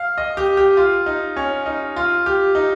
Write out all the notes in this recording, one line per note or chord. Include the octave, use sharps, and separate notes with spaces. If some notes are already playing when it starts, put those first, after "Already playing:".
Already playing: F5
D#5
G4
G4
F4
D#4
C#4
D#4
F4
G4
D#4